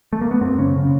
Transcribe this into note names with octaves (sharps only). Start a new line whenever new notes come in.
A3
A#3
B3
F#2 C4
C#3 C#4
C#3